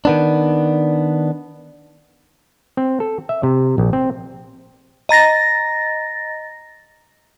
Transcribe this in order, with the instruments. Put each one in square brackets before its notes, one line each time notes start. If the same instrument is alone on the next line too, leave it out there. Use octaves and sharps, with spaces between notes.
[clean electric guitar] D#3 B3 D4
[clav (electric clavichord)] C4
A4
E5
C3
A#1
C4
[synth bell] D#5 A#5 A6 A#6